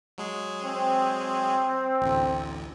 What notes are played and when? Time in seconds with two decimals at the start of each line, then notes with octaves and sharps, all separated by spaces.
0.18 F#3 G#3 G#4
0.64 C4
2.02 A1 D2